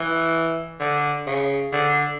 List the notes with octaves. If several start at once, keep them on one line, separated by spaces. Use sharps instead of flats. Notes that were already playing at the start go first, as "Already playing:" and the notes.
Already playing: E3
D3
C#3
D3